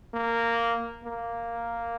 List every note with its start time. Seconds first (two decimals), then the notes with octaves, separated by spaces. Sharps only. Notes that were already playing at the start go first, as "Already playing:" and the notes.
0.14 A#3
1.04 A#3